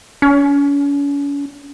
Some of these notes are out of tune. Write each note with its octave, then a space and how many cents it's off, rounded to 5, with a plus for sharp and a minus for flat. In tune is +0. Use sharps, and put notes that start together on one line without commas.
C#4 +40